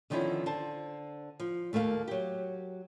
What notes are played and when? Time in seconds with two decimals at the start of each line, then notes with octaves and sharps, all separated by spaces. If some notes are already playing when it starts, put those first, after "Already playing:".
0.10 D3 D#3 F3 B3 C#4 E4
0.46 D3 C5 A5
1.40 F3
1.73 D#2 A3 A#3 C#5 F5
2.08 F#3 G4